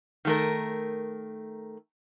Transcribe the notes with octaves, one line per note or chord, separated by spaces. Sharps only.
D#3 A3 A#4